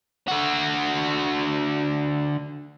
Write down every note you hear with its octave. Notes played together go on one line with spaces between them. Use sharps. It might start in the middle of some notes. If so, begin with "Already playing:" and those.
D3 F#4